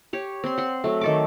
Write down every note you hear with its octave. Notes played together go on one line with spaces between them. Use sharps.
G4 C#5
C4 C6
F#5 C6
F#3 A3
D#3 A4 D6